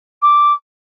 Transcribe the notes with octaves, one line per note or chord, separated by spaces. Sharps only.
D6